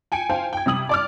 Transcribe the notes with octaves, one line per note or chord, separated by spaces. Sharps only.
G5 G#5 C#7 D7
C5 F5 G5 G#5
G5 G#6
C3 G3 D#6 F#7
D5 D6 F6